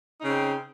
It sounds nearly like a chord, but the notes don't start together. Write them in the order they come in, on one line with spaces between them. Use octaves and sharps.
D#4 C#3 C4